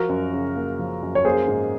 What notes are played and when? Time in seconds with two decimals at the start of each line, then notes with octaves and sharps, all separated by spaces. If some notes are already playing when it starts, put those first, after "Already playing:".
Already playing: F3 F#4 A#4
0.09 F#2
0.33 C#3
0.56 A#3
0.79 F3
1.03 F#2
1.15 C#5
1.25 A#3 G#4 C5
1.48 G#2